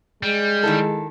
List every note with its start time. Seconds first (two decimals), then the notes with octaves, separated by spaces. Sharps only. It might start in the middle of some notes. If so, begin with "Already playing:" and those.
0.23 G3 G#3
0.63 D#3 E4 A4